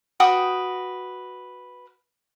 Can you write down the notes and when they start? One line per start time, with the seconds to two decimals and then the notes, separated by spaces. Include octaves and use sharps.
0.20 F#4 B4 G5 D#6